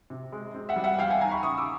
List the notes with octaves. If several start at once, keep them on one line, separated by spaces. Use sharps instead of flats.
C3
G#3
C4
E5 F#5
G3
E5 F#5
E2 F5 G5
F#5 G#5
D#3 G#5 A#5
B5 C#6
C#3 C#6 D#6
D6 E6